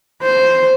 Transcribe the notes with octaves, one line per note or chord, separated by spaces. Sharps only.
C5